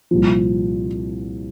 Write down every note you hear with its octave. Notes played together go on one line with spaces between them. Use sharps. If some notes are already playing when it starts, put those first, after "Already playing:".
C2 A#2 F3